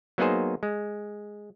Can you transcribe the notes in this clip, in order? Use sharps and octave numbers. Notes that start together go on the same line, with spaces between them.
F#3 A#3 B3 D#4 G#4 C5
G#3